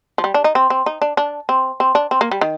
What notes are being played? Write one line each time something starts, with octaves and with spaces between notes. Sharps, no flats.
F3
G3
D4
D#4
C4
C4
D#4
D4
D4
C4
C4
D4
C4
A#3
G3
D#3